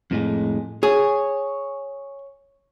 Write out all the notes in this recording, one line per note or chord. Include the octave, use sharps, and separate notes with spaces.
F2 A2 G#3
G#4 C#5